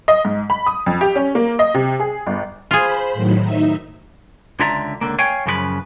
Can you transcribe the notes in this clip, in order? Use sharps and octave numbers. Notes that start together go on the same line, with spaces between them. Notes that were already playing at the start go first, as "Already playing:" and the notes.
D#5
G#2
B5
D#6
F2
G4
C#4
A#3
D#5
C3
G#4
G1
F4 G#4 C5 B5
A2 D#3 F#3
D#4 E5
C#2 D3 F4 D5 E5 A#5
C#2 D3 A#3
C#5 F5 G5 G#5
F#2 C#3 F3 G4 B4